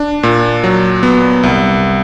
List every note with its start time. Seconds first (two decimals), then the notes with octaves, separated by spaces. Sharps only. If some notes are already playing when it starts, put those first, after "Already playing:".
Already playing: D4
0.23 A#2
0.64 F#3
1.03 B3
1.43 C2